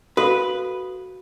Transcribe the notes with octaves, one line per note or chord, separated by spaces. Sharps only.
F#4 A4 B4 F5